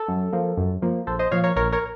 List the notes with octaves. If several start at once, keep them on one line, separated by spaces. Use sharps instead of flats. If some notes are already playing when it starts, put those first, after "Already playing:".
Already playing: A4
F#2
F3 A#3
F#2
F3 A#3
A#1 A4 C5
C5 D#5
A#2 F3 C#5 F5
A#4 C#5
A#1 A#4 C#5
A#4 C#5